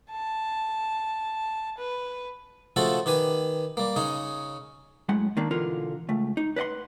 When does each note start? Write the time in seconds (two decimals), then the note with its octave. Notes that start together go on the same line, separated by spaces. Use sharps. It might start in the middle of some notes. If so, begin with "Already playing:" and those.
0.11 A5
1.78 B4
2.76 C#3 F3 A3 F4 F#4 A4
3.06 D#3 G4 B4 G#5
3.77 G3 A#3
3.96 C#3 C#4 D#4
5.09 F#2 A2 G#3 F#5
5.37 D#3 A#3 D4
5.51 B2 D3 E3 F4 A#4
6.09 C#2 A3
6.37 D#4
6.56 B4 C5 D#5 F#5 C6